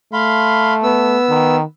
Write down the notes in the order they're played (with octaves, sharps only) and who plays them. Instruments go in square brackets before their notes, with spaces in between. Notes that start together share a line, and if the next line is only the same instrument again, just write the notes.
[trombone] A3 [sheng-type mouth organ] F5 B5 C6
[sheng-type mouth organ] B3 E6
[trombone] D#3